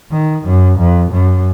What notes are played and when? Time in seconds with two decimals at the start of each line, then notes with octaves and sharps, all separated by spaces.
0.12 D#3
0.46 F#2
0.79 F2
1.12 F#2